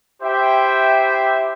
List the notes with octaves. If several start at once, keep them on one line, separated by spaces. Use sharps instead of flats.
E4 G4 C5 E5 G5